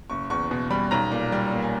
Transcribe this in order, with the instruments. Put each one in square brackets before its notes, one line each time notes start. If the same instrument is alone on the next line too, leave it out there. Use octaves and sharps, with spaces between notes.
[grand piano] F#1 C#6
E2 C#6
B2
G3 B5
B1 A#5
A#2
G3
A#3
G#5